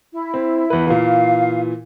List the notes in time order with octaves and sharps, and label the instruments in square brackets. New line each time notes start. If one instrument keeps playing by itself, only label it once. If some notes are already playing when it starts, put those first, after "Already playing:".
[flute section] E4
[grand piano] C4
E2 B4
[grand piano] A#2 E3 [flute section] F5